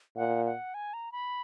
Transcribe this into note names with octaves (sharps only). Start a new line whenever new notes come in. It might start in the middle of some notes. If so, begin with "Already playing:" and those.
A#2 F#5
F#5
G#5
A#5
B5